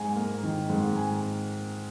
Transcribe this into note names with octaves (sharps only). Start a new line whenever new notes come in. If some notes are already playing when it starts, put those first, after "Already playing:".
Already playing: G#2 G#5
A#3
D#3
G#2
G#5